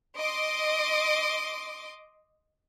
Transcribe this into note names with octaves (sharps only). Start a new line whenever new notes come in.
D#5 C6 D6